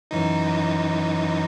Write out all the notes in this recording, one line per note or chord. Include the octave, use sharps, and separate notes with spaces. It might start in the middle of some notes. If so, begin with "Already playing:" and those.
F#2 E3 D#4